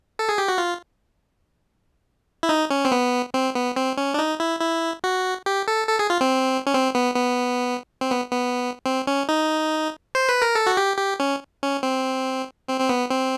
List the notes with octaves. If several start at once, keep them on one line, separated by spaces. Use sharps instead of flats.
A4
G#4
G4
F#4
F4
E4
D#4
C#4
C4
B3
C4
B3
C4
C#4
D4
D#4
E4
E4
F#4
G4
A4
A4
G#4
F4
C4
C#4
C4
B3
B3
C4
B3
B3
C4
C#4
D#4
C5
B4
A#4
A4
F#4
G4
G4
C#4
C#4
C4
C4
C4
B3
C4